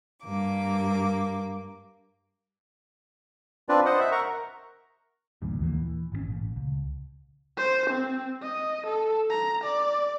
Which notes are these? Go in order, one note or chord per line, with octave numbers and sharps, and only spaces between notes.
G2 A#3 D6
C4 D4 F4 B4 D5
C5 D#5 F#5
E5
A#4 F#5 A#5 C#6
A1 D2 G2 A#2
D#2 A#2 E3 A#3
E3
G#1 C#3 C#4
A1 A#2
C#2
C5
C4
D#5
A4
A#5
D5